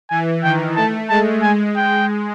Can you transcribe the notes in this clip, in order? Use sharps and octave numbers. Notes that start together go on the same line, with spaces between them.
E3 G#5
D#3 G5
A3 A5
G#3 A5
G#3 G#5
G5